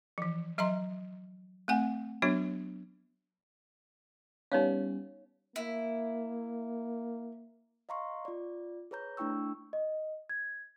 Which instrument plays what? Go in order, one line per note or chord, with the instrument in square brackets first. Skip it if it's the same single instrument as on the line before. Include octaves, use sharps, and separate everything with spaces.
[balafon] E3 F3
F#3 D#5 E5 A#5 C6
A3 C4 F#5 G#5
F#3 B3 D4 F#4 C#5
[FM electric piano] G3 B3 C#4 [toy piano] D#4 C#5 F5
[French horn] A#3 [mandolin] E4
[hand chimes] D#5 F5 A#5 C6 C#6
F4 D5
G#4 B4 C#5 A#5 G6
A3 D4 E4 G5 C#6 E6
[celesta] D#5
G#6